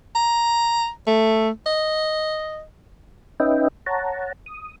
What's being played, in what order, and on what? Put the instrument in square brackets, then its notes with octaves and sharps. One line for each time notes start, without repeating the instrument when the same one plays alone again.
[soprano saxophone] A#5
A3
D#5
[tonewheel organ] C#4 D#4 B4 D#5 E5 G5
C#5 F#5 A5 A#5
D#6